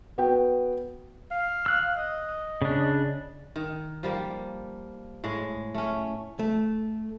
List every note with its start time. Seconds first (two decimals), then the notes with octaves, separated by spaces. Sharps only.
0.18 B3 F#4 B4 G5
1.31 F5
1.66 E6 F#6
1.97 D#5
2.62 C#3 D4
3.56 D#3
4.03 F3 G3 A#3
5.24 A2 G#3
5.74 A3 C#4
6.39 A3